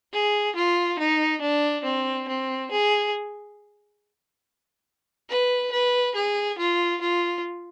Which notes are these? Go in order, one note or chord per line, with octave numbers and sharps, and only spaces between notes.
G#4
F4
D#4
D4
C4
C4
G#4
B4
B4
G#4
F4
F4